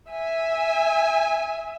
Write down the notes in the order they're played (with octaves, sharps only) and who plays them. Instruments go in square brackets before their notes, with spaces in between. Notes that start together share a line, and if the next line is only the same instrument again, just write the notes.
[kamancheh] E5 G#5